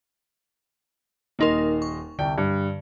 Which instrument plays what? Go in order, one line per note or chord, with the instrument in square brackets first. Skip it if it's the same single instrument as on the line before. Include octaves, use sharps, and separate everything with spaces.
[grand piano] D#1 D#5 C6 [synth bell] A#3 D#4 A#4
[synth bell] C#6
[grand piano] C2 G5 [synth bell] D3
[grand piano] G2